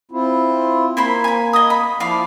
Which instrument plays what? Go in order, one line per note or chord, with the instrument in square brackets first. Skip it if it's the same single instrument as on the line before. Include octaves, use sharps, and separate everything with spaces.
[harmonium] C4 E4 F4
[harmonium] A#3 [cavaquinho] E4 C5 B5
[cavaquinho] G#5 B5
D#5 D#6
B5
[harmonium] F3 E4 [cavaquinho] D5 F5 B5